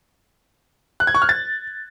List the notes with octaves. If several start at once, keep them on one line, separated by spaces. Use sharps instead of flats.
F#6
G#6
C#6
F6
A6